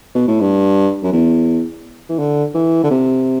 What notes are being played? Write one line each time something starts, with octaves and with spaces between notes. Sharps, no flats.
B2
A2
G2
F#2
E2
E3
D3
E3
D3
C3